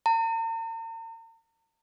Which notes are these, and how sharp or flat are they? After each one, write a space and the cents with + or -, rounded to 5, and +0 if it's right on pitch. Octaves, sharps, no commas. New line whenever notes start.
A#5 -45